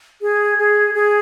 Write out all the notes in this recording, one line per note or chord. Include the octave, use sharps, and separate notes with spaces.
G#4
G#4
G#4